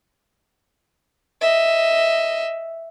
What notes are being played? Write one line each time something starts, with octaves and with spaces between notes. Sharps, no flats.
D#5 E5